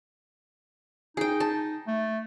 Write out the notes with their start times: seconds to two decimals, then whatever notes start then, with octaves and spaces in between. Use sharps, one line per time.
1.17 D#4 G#4 G5
1.40 A5
1.87 A3